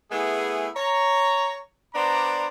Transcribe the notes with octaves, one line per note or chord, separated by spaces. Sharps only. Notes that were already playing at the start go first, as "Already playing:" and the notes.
A3 B3 E4 G#4
C#5 A#5
B3 D4 C5 D5 A#5